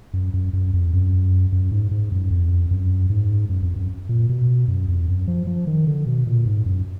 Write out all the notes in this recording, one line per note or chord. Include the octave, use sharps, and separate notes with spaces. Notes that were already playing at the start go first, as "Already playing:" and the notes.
F#2
F#2
F#2
F2
F#2
F#2
G#2
G#2
F#2
F2
F#2
G#2
F#2
F2
F#2
A#2
B2
F#2
F2
F#2
F3
F3
D#3
D3
B2
A#2
G#2
F#2